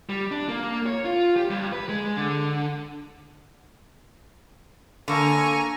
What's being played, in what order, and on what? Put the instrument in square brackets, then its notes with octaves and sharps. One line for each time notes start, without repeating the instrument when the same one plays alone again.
[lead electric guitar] G3
D4
A#3
C#5
F4
G4
G2
B4
G#3
D3
[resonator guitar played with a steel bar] D3 A#3 [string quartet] G#5 A#5 C#6